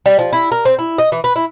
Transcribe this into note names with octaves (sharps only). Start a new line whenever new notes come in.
G3
F3
E4
A#4
C4
E4
D#5
E3
B4
E4